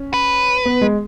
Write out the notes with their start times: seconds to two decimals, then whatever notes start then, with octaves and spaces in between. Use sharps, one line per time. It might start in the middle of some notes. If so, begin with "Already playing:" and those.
Already playing: C#4
0.14 B4
0.66 B3
0.81 G#3